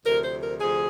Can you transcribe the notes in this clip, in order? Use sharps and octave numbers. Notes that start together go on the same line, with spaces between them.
D2 C3 F3 A#4
C5
A#4
D2 C3 F3 G#4